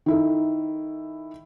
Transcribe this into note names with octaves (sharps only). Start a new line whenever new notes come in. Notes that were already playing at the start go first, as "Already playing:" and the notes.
D#3 E4 A4